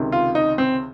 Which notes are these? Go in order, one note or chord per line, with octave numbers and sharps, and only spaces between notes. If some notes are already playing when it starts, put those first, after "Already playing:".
Already playing: C#2 C3 D#3
F4
D#4
C4